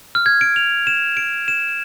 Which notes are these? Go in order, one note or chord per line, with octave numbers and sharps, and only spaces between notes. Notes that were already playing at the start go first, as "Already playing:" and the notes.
F6
G#6
D7
F7
E7
D7
E7